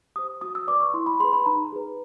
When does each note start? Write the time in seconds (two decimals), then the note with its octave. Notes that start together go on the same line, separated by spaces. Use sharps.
0.16 G4 C5 D#6
0.41 F#4 D#6
0.55 E6
0.67 B4 D5 D6
0.80 C#6
0.94 E4 C6
1.06 B5
1.20 G#4 B4 C6
1.33 B5
1.46 D#4 A#5
1.72 G#4 B4